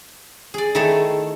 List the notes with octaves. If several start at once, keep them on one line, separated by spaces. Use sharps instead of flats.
G#4 D5
D#3 A3 E4 G#4 A4 C#5